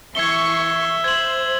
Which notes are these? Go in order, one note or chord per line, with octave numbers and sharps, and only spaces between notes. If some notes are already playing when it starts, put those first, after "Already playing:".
E3 E5 C#6 G#6 C7 G7
C5 G#6 F#7